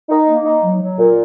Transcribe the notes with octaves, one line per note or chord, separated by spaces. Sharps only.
D#4
A#3
D#4
F#3
F#3
A#2